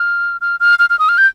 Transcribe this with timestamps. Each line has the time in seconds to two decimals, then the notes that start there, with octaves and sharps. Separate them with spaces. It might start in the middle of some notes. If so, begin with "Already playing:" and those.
Already playing: F6
0.41 F6
0.60 F6
0.79 F6
0.90 F6
0.99 D#6
1.09 F6
1.18 G6